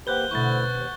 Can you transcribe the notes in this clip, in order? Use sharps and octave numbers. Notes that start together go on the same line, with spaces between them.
A#3 G4 B4 C5 F#5 F#6 G6 G7
B2 D3 A3 C#4 E4 C#6 G6 A6
D#2